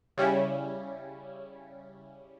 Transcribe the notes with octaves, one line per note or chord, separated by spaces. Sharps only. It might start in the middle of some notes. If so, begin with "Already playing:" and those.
C#3 G3 C#4 E4